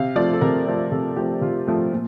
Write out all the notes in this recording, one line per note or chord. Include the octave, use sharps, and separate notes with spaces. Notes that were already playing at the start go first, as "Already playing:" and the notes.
Already playing: C3 F5
F3 A3 C4 D5
A4
C3 A#4
F3 A3 C4
C3 A4
F3 A3 C4 G4
C3 F4
F3 A3 C4
A#2